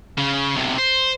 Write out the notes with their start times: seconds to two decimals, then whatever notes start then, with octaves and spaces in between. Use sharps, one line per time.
0.18 C#3
0.56 B1 C3
0.78 C5